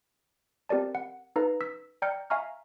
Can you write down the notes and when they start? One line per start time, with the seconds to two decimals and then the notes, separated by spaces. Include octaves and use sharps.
0.69 C4 G4 A#4 D5 A5
0.95 F#5
1.36 D#4 A4 B4 F5 A#5
1.61 E6 B6
2.02 D5 G5 A#5 F6 G6 C#7
2.30 E5 F5 G#5 A#5 C#6 F6